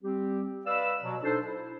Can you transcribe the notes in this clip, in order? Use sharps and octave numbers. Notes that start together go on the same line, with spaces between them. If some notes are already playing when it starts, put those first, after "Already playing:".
G3 C4 G4
B4 D5 D#5 F5 B5 E6
B2 F#3
D4 D#4 A4 C5
E4